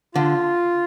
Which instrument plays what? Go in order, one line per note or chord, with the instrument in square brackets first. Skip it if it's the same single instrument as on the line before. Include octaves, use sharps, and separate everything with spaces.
[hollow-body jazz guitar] D3 [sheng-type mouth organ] F4